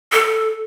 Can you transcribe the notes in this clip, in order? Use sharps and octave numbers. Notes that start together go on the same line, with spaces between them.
A4